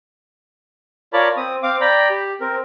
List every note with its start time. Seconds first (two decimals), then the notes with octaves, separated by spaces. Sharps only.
1.13 F4 A#4 C#5 D5 A5 B5
1.37 C4 D#6
1.63 C4 F5 D6
1.81 D5 G5 A#5 B5
2.10 G4
2.41 C4 A#4